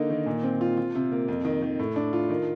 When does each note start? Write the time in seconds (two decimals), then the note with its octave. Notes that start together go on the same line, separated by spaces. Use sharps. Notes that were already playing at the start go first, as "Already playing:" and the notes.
Already playing: D3 A#3 D#4
0.10 D#3
0.26 A#2
0.43 C4
0.61 F4
0.77 F4
0.95 C3
1.12 A#3
1.28 F2
1.45 D#3
1.62 D#3
1.79 A2
1.96 D4
2.13 F4
2.30 D#3